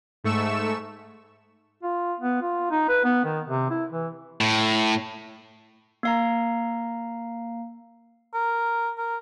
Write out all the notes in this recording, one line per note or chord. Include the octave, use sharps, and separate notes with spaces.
G#2 A3 C#6 E6 E7
F4
B3
F4
D#4
B4
B3
D#3
C3
E4
E3
A2
A#3 F5 A#5
A#4
A#4